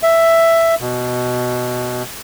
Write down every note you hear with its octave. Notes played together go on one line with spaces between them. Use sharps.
E5
B2